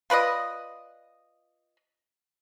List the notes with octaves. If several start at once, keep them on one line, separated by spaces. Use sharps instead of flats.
F4 B4 D5 D#5